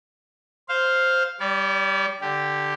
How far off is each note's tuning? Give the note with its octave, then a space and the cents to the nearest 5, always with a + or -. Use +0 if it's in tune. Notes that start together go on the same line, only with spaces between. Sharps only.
C5 +0 F5 +0
G3 +0 D5 -45
D3 +0 G4 +0